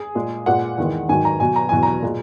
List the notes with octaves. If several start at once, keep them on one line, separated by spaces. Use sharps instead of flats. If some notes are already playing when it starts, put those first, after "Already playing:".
Already playing: G#4
A#2 G#3
A#2 G#3 F#5
E2 D#3 G#3
G#2 D#3 F#3 G#5
A#5
B2 F#3 G#5
A#5
E2 B2 F#3 G#5
A#5
A#2 G#3